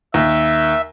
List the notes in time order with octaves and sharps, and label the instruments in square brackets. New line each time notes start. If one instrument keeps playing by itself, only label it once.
[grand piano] D#2 [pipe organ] E5